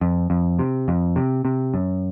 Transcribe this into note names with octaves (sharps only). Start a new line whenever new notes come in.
F2
F2
C3
F2
C3
C3
F#2